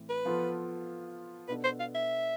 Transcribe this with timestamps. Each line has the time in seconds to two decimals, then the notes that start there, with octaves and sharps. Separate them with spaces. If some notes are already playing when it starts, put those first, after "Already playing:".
Already playing: A2 E3 C4
0.09 B4
0.25 F3 B3 F4 A4
1.48 B2 B3 D4 A4 B4
1.64 C5
1.80 F5
1.95 E5